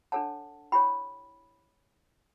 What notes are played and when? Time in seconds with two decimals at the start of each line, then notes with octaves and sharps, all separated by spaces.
0.12 D4 A4 C#5 F#5 A5
0.72 E4 G4 C#5 G5 B5